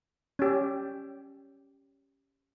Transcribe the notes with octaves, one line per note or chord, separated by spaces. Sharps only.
C#4 G4